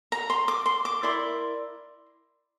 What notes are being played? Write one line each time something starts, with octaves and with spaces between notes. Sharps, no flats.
A#5
C6
D6
C6
D6
E4 A#4 D5 C6